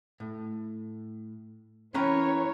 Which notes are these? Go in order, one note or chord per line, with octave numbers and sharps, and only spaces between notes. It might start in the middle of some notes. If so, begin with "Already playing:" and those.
A2
E3 C#4 A#4 B4 C#5 G5